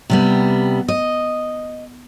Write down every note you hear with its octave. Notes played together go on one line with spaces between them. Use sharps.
C3 G3 B3
D#5